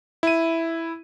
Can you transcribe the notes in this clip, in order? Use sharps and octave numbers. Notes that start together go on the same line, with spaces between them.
E4 D#7